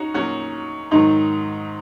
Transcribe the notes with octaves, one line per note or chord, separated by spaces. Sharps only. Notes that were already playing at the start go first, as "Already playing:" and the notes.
Already playing: C#4 D#4 F#4
A#2 F#3 C#4 F#4
G#2 D#3 F#3 D#4